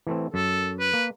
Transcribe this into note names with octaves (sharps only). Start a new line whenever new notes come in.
E3 A3 C4
F#2 A4
B4
A#3